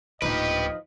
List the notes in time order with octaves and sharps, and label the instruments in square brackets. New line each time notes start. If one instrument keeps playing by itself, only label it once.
[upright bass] D1 A#2 [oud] F3 D#4 [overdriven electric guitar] G4 B4 [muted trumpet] D#5